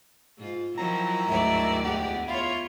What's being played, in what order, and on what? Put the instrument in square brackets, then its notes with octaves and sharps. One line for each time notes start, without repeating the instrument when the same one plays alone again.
[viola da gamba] G#2 F4
[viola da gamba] D#3 F#3 E4 [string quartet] F3 [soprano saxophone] A#5
[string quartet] D2 G#2 D5 [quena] E5
[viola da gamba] E2 G#3 B3 [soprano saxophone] G4 [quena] F#5
[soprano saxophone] E4 [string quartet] F4 C#5 [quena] F5